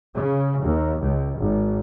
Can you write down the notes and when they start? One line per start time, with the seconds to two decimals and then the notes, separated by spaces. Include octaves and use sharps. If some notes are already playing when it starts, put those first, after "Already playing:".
0.16 C#3
0.63 D#2
1.02 C#2
1.38 G#1